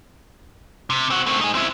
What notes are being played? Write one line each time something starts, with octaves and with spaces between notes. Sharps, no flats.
C3
C4 F#4
A3 C4
D#4 G#4
C4 E4